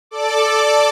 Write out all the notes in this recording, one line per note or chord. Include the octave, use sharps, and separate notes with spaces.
A4 D5 D6